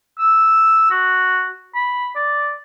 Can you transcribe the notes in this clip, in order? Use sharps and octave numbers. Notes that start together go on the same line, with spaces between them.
E6
F#4
B5
D5